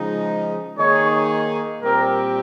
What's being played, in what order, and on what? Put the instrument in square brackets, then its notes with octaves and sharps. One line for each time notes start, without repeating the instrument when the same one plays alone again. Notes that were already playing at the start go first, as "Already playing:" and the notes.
Already playing: [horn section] C#3 F3 G#3 D#4
[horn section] D#3 A#3 D#4 G#4 [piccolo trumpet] C#5
[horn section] A#2 G3 C4 G4 [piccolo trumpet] A#4